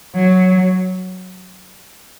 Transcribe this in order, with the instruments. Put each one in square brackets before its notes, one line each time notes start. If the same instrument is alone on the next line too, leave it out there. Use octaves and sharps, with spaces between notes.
[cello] F#3